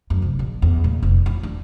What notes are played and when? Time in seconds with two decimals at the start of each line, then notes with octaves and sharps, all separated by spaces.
0.10 F#2
0.22 F1
0.39 A#1
0.62 E2
0.84 A#2
1.03 F1
1.26 E4
1.43 D4